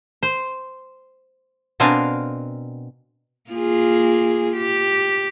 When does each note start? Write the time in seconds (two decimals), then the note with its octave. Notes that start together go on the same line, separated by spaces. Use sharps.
0.23 C5
1.80 B2 C4 D4 A#4 F5 G#5
3.50 A#3 F4 G#4
4.57 G4